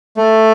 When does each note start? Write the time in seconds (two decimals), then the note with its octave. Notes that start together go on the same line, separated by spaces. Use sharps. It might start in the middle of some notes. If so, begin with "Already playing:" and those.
0.17 A3